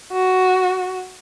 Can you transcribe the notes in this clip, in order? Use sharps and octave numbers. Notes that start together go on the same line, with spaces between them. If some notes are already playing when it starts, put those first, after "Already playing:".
F#4